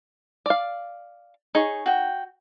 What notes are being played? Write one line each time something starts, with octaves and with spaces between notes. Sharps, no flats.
D5 F5
D#4 G#4 C#5
F#4 G5